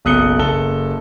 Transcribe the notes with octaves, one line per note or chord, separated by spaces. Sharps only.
F#1 B1 D#6 F#6 C#7 G7
F#1 A4 G7